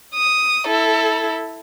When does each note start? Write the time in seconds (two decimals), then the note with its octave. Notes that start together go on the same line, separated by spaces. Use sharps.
0.15 D#6
0.66 E4 A4